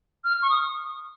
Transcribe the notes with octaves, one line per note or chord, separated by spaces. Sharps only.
F6
C#6
D#6